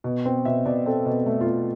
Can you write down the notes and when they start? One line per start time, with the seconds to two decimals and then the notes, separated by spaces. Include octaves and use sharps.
0.04 B2
0.25 C4
0.45 B2 E5
0.65 B2 D5
0.86 C4 A4
1.06 B2
1.26 A3
1.41 F4
1.46 A3